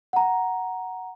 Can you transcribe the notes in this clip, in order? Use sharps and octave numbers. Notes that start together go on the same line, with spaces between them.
F#5 A#5